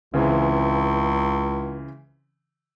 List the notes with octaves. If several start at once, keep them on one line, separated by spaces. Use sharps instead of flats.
C#2 C#3 E3 C4